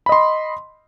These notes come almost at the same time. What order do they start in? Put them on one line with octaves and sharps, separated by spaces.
B5 D#5 C6